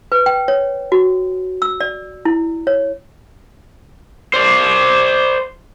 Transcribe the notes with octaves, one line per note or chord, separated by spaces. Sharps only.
B4
G5
C#5
F#4
E6
D5
E4
C#5
C5 D5